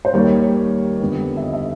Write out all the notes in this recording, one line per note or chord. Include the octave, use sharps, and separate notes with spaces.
C5
D#2 D#3 G3 A#3 C#5
F2 D3 G3 B3
E5
D#5
E5